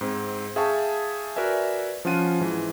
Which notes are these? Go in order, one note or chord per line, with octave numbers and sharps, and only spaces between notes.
G#2 C4
G#4 E5 F5 G5 A5 C#6
F#4 A#4 B4 D5 E5 G#5
F3 C#4 F4 F#5 D#7
G#2 E3